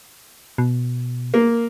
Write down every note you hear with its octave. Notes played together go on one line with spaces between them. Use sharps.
B2
A#3